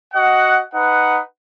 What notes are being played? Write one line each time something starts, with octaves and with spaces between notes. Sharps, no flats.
F#4 D#5 F#5
D#4 B4 F#5